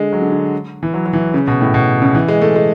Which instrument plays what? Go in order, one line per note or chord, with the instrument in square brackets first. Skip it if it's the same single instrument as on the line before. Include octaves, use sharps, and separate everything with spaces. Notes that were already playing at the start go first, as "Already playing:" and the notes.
Already playing: [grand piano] D3 G#3
F#3
D3
D3
E3
F#3
F#3
E3
C#3
B2
A2
B2
C#3
E3
G#3
A3
G#3